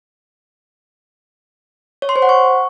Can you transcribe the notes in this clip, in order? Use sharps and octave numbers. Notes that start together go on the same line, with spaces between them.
C#5
C6
C5
F#5
C#6